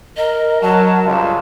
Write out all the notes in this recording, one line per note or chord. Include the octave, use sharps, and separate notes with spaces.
A#4 D#5
F#3 A5
C#2 G2 F4